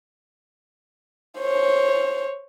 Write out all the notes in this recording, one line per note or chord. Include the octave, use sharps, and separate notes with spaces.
C5 C#5